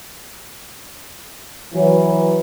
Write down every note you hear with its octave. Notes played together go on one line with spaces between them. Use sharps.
E3 F#3